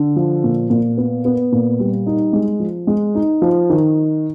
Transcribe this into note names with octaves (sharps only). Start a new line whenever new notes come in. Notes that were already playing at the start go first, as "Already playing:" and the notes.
Already playing: D3
F3
A#2
A#2
B3
B3
A#2
G3
D#4
G#3
F3
G#3
D#4
F3
D#3